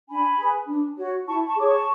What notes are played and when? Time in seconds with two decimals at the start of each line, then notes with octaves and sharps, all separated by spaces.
0.09 D4 G#5 B5
0.39 G#4 B4
0.68 D4
0.98 F#4 C#5
1.27 E4 A5 C#6
1.46 A5 C#6
1.56 G#4 C#5 D6
1.66 A5 C#6